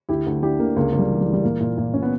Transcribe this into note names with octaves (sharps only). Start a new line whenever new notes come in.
D2 E4 G4
D2
D3 E4 G4
D3 A#3
C#2 A#3
C#2
G3
E3
G3
E3
G3
A#2 A#3
A#2
A#2
A#2 C#4
B3